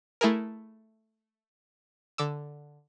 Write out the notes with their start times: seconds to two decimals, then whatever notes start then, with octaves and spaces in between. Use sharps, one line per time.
0.21 A3 E4 G#4 A#4
2.18 D3 D6 E6